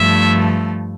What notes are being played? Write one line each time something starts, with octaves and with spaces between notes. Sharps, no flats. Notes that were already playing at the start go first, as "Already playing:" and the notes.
Already playing: G2 F3 A3 E5